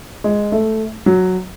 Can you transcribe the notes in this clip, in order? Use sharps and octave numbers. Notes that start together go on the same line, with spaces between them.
G#3
A3
F#3